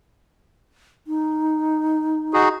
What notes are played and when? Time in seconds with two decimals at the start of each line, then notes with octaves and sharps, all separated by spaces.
1.07 D#4
2.33 D#4 F#4 G#4